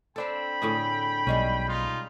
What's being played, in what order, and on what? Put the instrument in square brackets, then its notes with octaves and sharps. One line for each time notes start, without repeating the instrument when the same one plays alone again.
[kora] C4 D4 A4 [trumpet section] G5 B5
[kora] A2 D3 G#4
[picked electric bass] B1 [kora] G3 G#3 C#4
[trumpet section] D#4 F4